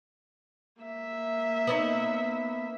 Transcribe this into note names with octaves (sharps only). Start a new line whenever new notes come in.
A#3 E5
B3 C#4 D#4